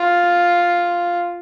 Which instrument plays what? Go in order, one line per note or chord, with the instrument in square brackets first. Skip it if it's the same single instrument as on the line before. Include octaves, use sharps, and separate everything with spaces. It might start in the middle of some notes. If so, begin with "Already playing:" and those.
Already playing: [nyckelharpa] F4